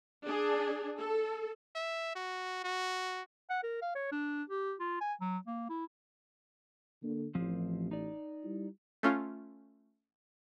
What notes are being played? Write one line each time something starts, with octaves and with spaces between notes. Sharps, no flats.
D4 G#4
A4
E5
F#4
F#4
F#5
A#4
F5
C#5
D4
G4
F4
G#5
F#3
A#3
E4
D3 A#3
A1 F3 C4
D#4 D5
G3 E4
A3 C#4 F4